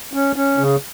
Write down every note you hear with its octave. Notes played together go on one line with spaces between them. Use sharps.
C#4
C#4
C#3